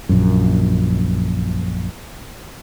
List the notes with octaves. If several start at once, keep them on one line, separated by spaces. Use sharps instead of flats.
A#1 F#2